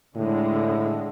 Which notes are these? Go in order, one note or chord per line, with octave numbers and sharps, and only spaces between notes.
A2 D3 G#3